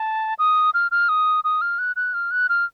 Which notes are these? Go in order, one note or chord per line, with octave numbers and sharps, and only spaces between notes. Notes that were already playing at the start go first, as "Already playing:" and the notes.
Already playing: A5
D#6
F6
F6
D#6
D#6
F6
F#6
F#6
F6
F#6
F6